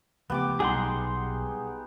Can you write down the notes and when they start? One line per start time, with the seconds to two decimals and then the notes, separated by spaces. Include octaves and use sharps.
0.30 C#2 F3 A3 B3 G4 D6
0.60 B1 G3 D#4 G#4 F#5 C6